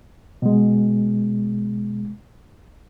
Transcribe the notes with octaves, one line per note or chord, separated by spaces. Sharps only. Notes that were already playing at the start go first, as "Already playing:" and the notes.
B2 G#3